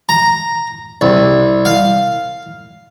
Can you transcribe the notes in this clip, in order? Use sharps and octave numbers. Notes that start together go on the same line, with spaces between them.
A#5
C2
F5